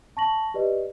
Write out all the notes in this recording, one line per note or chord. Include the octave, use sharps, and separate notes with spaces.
A5 C#6 A#6 F#7
G4 B4 D5 D#5